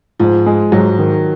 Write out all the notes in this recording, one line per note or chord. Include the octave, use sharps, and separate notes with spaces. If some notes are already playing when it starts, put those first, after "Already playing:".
G#2 F3
G#3
G#2 F#3
D#3